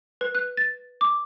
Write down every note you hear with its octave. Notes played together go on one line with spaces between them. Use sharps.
B4
F#6
A6
D6